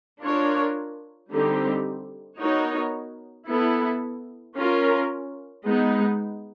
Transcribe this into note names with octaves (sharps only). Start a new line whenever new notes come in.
D4 F4 A#4 C#5
D3 G3 C4 D#4 G4
B3 D#4 F#4 A#4 C#5
B3 E4 A4
C#4 F4 A#4
G#3 B3 D#4